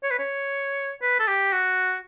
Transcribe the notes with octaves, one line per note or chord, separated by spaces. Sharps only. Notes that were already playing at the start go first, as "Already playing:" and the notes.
C#5
B4
C#5
B4
A4
G4
F#4